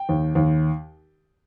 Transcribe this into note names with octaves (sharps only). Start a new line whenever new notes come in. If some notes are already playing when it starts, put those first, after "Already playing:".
Already playing: G5
D#2
D#2